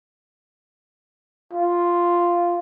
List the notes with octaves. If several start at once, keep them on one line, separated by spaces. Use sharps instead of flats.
F4